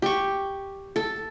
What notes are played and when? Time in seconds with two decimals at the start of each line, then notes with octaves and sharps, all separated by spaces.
0.02 G4 C#6
0.96 A4